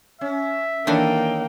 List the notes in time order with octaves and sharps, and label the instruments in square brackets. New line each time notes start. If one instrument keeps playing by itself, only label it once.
[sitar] C#4 [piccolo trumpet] E5
[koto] D#3 E3 D4 [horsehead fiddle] A#3 G5 [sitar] C#4 A4 D#5